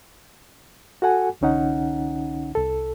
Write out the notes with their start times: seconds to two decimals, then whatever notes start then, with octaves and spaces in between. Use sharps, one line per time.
1.02 F#4 A4 F#5 G#5
1.41 C2 D3 C#4 D#4 F#5
2.55 C2 A4